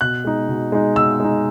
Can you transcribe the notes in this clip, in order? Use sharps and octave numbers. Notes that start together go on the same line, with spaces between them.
B2 F#6
G#3 D#4
B2
G#3 D#4
B2 E6
G#3 D#4